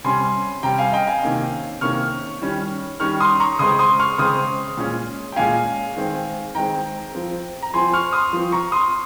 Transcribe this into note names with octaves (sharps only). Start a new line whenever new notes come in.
C3 G3 C#4 G#5 C6
C3 G3 C#4 G5 A#5
F5 G#5
D#5 G5
F5 G#5
C3 D#3 A#3 C#4
C3 D#3 A#3 C#4 C#6 F6
D#3 G3 C#4
D#3 G3 C#4 C#6 F6
C6 D#6
A#5 C#6
C#3 G#3 C4 C6 D#6
C6 D#6
C#6 F6
C#3 G#3 C4 C6 D#6
A#2 G#3 C#4
G5
A#2 G#3 C#4 F5 G#5
D#3 G#3 C4
D#3 G#3 C4 G5 A#5
F3 C4
A#5
F3 C4 G#5 C6
C#6 F6
C6 D#6
F3 C4
A#5 C#6
C6 D#6